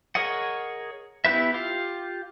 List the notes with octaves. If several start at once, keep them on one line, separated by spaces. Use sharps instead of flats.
G#4 A#4 C#5 D#5 F#5
B3 E4 G4 B4 E5
F4 G4 F5